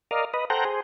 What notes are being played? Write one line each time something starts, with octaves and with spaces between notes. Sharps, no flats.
A#4 D5 D#5 F5
B4 D#5
A4 C5 F#5 G5 A#5
G#4 C5